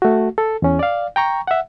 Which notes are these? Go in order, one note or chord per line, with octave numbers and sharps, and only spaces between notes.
A3 F#4
A4
E2 C#4
D5 F5
G5 A#5 C#6
E5 F#5